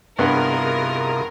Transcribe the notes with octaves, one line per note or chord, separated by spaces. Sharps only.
G2 C3 B3 E4 F4 G#4 A#4 D#5